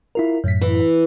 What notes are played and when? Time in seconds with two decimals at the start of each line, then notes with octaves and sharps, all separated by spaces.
0.15 E4 F4 A#4
0.44 F#2 A2 B6
0.61 E3